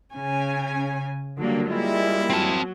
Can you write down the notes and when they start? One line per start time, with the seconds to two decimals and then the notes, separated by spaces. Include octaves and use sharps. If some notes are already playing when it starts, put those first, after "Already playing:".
0.15 C#3 C#4 G#5
1.38 D3 F#3 G3 A#3
1.69 G3 G#3 A#3 E4 F4
2.30 F#3 C4 A5